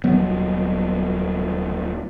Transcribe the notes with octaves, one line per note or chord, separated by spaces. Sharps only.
D#1 F#3 B3